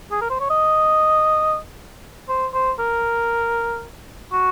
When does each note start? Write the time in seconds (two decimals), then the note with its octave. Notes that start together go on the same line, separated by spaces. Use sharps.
0.11 G#4
0.21 A#4
0.30 C5
0.40 C#5
0.50 D#5
2.29 C5
2.54 C5
2.79 A#4
4.33 F#4